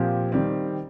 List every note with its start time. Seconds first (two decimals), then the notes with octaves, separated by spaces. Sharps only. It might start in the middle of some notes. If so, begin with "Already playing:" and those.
Already playing: A#2 F3 C4 G4
0.32 D#3 G3 C4